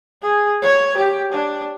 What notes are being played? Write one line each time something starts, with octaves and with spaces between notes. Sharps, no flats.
G#4
C#5
G4
D4